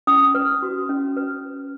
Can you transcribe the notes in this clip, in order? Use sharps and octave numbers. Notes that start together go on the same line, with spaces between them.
C#4 D#6
B4
F#4
C#4
B4